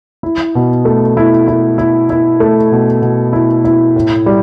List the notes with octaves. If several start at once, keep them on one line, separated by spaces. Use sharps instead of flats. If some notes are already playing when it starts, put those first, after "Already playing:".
E4
B2
A3
E4
E4
E4
E4
A3
B2
B2
E4
E4
A2
G3